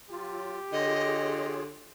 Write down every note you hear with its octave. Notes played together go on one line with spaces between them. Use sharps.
F#3 F4 G4
D3 F4 G#4 C#5 D#5